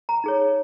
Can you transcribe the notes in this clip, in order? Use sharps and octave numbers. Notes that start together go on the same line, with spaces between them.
A#5
D#4 G#4 C#5